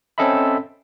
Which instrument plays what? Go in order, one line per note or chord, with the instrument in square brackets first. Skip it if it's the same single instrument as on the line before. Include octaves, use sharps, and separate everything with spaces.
[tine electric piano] C4 C#4 A4 D#5 E5 B5